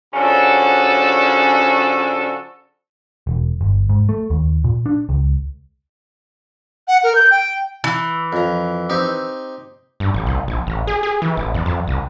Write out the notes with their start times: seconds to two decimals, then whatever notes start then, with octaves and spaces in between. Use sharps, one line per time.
0.14 C#3 F3 C#4 D4 F#4 A4
3.27 E1
3.61 G1
3.89 G#2
4.09 A3
4.30 D#2
4.64 A#2
4.86 D4
5.09 C#2
6.88 F#5
7.03 A#4
7.15 G6
7.31 G5
7.84 E3
8.33 F2 A#5
8.90 C4 D#4 G4
10.00 G2
10.14 A1
10.26 C2
10.48 A#1
10.67 A1
10.87 G#4
11.03 G#4
11.22 E3
11.37 A1
11.54 E2
11.66 F2
11.88 C2